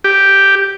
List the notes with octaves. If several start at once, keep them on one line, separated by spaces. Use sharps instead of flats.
G4